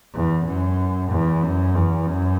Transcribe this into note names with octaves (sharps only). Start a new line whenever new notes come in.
E2
F#2
E2
F#2
E2
F#2